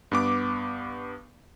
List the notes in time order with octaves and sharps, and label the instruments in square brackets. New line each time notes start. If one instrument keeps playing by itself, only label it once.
[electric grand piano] G2 B3 D6